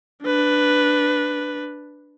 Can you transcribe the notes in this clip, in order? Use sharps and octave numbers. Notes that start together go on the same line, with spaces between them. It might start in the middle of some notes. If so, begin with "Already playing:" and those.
D4 B4